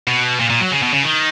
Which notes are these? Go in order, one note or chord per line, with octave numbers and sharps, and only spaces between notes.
B2
A#2
A#2
F#3
C#3
B2
C#3
D#3